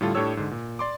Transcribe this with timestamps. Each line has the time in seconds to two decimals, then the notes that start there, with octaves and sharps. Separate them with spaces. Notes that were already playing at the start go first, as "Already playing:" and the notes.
0.01 A2 D3 G3 F4 A4
0.15 A2 D4 G4 A4 C#5 E6
0.37 G#2 D3
0.51 A#2
0.79 D5 C6 D6